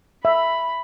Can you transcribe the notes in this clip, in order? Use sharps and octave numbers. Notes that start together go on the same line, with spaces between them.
E5 B5